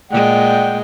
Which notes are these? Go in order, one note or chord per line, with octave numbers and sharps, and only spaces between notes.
A#2 G#3 D5 F#5 G5